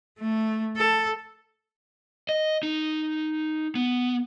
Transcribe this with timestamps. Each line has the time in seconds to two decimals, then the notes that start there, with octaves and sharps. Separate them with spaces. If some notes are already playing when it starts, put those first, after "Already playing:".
0.19 A3
0.77 A4
2.29 D#5
2.63 D#4
3.75 B3